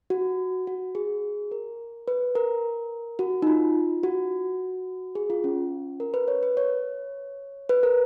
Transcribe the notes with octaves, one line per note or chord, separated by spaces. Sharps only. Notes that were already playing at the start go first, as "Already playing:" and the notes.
F#4
F#4
G#4
A#4
B4
A#4
F#4
D#4
F4
F#4
G#4
F4
C#4
A#4
B4
C#5
B4
C#5
B4
A#4